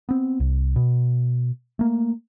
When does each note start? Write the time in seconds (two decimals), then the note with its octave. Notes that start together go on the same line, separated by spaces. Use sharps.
0.09 B3 C4
0.40 C2
0.76 B2
1.79 A3 A#3